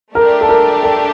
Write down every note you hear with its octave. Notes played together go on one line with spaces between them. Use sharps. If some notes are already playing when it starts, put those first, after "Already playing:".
A3 D4 G4 A#4
A4
A#4
A4